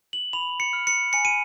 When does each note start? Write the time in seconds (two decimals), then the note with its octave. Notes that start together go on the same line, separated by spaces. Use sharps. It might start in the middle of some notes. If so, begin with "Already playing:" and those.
0.13 F#7
0.33 B5 F7
0.60 C#7
0.73 F6
0.87 C#7
1.13 G#5 C#7
1.25 D#7